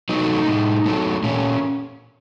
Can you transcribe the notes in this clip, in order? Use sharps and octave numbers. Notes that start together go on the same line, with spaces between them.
F#3 A3 D#4
A2
F#3 A3
A#2 C#4